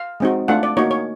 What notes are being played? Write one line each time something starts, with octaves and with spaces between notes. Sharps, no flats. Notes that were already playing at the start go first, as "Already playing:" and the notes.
Already playing: F5
G#3 C4 D#4 F#4
A3 D4 F4 F#5
D5
A#3 D#4 F#4 C#5
C#5